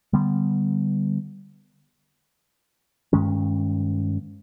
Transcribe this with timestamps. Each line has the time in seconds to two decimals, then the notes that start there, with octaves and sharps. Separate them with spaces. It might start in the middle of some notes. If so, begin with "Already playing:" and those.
0.13 D3 G3 B3
3.13 G2 D#3 G#3 C#4